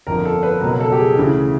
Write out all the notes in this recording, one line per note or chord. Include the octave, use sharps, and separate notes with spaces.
G1 F2 D3 F3 A#4
A4
B4
C#2 B2 F#3 A#4
A4
G4
G#4
D2 C#3 E3